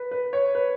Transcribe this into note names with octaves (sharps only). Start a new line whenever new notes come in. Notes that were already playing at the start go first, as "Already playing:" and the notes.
Already playing: B4
B4
C#5
B4